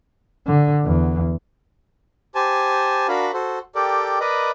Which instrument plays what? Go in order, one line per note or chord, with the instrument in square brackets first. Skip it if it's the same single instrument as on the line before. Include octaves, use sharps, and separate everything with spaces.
[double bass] D3
E2
[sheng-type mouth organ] G4 C5 G#5 A5
D4 F#4 A#4 F5 B5
F#4 A4 C5
G4 A4 A#4 D5 G5
A#4 B4 D5 D#5 B5